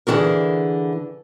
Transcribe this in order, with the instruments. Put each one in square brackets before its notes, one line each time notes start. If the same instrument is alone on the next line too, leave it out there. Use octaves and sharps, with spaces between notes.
[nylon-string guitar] D3 E3 F#4 G#4 A#4